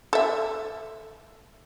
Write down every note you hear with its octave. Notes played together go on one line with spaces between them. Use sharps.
A4 E5